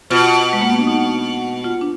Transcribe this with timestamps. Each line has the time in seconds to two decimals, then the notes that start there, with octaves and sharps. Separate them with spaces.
0.10 B2 F4
0.53 G#3
0.61 A#3
0.70 B3
0.79 D4
0.87 D#4
1.64 F4
1.81 D4